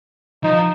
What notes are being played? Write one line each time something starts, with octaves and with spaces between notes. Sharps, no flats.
F3 D#4